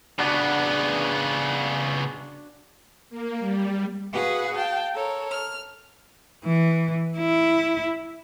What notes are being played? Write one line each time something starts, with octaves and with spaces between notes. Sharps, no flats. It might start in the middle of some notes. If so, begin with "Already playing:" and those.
C#3 B3 D4 F#4
A#3
G3
F#4 G#4 B4 F5 F#5
F5 G5 A5
A4 A#4 C#5
F6
E3
E4